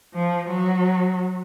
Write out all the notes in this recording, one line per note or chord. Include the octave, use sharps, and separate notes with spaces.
F3
F#3